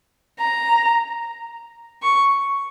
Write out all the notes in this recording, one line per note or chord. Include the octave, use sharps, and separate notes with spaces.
A#5
C#6